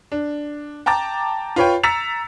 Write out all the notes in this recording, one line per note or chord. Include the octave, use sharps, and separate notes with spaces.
D4
G5 A5 A#5 D6 A6
F4 B4 C#5 G5
A#5 E6 A6 B6 C#7 F7